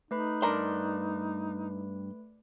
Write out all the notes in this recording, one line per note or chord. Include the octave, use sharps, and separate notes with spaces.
A3 D#4 B4 B5
G2 D4 A#4 C6